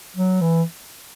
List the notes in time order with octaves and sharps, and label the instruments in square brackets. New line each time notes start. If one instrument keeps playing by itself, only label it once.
[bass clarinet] F#3
E3